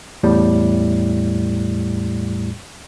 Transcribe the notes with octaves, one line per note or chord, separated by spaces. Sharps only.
E2 A2 G3